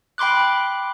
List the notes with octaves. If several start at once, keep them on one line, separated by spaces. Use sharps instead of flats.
G5 B5 C6 D6 F#6